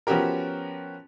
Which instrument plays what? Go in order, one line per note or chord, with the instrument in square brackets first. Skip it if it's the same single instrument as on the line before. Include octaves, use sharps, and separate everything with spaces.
[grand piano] F3 B3 C#4 F#4 G4 A#4